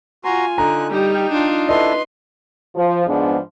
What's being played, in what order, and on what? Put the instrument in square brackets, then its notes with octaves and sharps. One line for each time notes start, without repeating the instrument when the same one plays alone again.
[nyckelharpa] F4 G#5 [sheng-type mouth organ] F#4 A#5 C6
[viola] D3 [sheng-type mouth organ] D#4 F#6 [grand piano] A#5
[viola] G3 [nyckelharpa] D#4 [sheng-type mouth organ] G5
[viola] D4 F4
[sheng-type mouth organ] D4 E4 A4 [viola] B4 C6 [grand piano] D#5
[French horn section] F3
G#2 F3 G#3 B3 D4